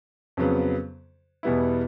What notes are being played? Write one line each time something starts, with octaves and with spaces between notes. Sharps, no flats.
F2 C#3 F#3 B3
E2 B2 G3 B3 E4